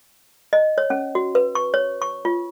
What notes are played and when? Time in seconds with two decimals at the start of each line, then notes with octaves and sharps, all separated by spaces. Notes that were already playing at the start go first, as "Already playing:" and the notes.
0.53 D#5
0.78 C#5
0.90 C#4
1.15 F#4
1.35 B4
1.55 C#6
1.74 C#5
2.02 C#6
2.25 F4